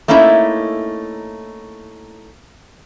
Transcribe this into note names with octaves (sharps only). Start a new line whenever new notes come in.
A3 A#3 C#4 D#4 E4 E5